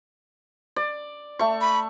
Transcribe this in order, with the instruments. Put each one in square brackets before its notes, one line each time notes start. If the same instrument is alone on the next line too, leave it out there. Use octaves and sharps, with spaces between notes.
[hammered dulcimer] D5
A3 C#6
[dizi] B5